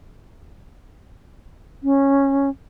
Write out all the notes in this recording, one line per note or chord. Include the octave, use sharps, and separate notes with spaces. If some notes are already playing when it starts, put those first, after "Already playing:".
C#4